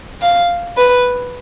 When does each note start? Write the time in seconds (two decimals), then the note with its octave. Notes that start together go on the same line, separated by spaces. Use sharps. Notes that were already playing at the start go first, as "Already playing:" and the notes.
0.22 F5
0.77 B4